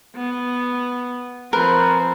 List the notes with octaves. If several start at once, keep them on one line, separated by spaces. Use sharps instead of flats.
B3
F3 C4 A#4 B4